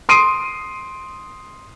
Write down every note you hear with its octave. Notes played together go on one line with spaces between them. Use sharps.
C6 D#6 C7 D7 D#7